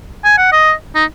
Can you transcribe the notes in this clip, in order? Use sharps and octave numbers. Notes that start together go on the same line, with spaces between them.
G#5
F#5
D#5
D#4